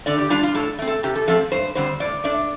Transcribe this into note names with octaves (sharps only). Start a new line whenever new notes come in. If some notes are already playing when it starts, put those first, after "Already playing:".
D3 D5
G4
G3 D4 F4
F4
A2 A4
A3 C4
A4
C3 G4
A4
F3 A3 C4 A4
G2 C5
D3 G3 C4 C5
A2 D5
A3 D4 D5